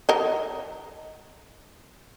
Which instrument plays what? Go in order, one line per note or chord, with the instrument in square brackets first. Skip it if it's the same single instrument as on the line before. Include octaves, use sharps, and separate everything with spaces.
[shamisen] A#4 D#5